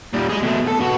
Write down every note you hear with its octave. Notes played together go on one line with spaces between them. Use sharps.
A#2 G3
G#4 D#5
B2 A3
A4
B3 F#4